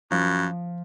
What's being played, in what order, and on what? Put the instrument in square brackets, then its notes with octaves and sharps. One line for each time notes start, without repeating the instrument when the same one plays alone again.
[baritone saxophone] F#2 [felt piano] F3